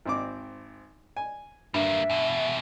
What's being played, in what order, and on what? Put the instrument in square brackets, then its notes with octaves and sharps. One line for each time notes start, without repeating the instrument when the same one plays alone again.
[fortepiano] G#1 C4 D6
G#5
[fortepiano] G2 [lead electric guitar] G3 A#3 [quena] E5
[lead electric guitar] E2 B2